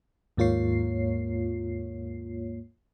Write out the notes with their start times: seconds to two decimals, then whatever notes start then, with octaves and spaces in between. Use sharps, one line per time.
0.37 D#2 G#2 A#3 F4 C#5 C7